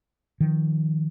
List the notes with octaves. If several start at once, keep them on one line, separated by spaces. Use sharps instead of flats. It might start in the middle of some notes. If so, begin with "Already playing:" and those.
D#3 F3